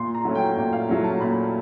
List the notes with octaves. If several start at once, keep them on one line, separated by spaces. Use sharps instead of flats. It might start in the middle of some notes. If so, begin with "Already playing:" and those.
Already playing: A#2 C6
A#5
F#3 A3 C#4
G5
A#2 G5
F5
F#3 A3 C#4
A5
A#2 B5